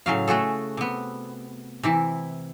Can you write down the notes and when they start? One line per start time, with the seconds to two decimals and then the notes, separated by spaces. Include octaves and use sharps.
0.06 A2 C#3 F#3 F5
0.28 A3 F#4 G#4 A4
0.77 C3 B3
1.83 C3 E3 E4